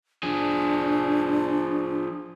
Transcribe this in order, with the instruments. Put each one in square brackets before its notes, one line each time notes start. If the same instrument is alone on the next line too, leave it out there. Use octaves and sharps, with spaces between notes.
[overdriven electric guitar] F3 G#4 [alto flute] D4